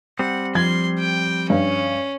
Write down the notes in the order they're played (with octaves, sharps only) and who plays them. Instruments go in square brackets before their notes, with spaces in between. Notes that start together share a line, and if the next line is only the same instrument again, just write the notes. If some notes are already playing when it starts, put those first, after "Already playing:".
[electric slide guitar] G3 C4 [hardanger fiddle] F#5
[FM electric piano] F3 [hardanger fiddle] C6 [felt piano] G#6
[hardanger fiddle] G5
[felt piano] G2 [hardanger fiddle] C#4